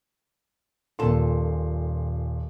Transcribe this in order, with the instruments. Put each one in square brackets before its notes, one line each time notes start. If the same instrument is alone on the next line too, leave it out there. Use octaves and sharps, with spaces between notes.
[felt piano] D#1 C6 [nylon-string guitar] A#2 A4 A5